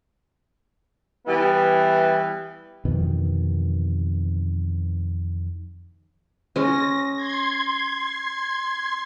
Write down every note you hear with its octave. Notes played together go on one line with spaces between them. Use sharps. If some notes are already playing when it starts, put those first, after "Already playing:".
E3 G3 B3 E4
F2 B2 D#3 E3
G#3 C#4 A#6
C6 G#6